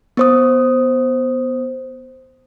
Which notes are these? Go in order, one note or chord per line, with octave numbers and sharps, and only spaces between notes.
B3 C5 D#6